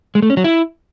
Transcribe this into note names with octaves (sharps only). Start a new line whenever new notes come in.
G#3
A3
C#4
F#3
E4